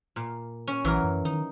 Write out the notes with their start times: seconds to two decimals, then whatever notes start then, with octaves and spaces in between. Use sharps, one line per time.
0.16 A#2
0.67 C#4
0.85 A#1 E3 F#3 A#4
1.04 F#2
1.25 D#3 D#4